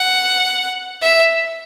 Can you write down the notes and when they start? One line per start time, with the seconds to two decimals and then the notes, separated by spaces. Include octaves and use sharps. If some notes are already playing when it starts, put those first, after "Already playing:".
Already playing: F#5
1.02 E5